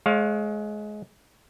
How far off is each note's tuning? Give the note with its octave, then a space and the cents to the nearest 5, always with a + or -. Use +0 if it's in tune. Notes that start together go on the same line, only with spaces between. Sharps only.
G#3 +25 C#5 -20 F5 +10